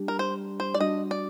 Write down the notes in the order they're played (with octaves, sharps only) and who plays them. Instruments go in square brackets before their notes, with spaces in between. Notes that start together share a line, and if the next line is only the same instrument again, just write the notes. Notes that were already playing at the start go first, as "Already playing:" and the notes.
Already playing: [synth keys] G3 D4 G4
[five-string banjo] A#4
C5
C5
D5
[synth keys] G3 D4 F#4 [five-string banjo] D#5
[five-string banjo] D5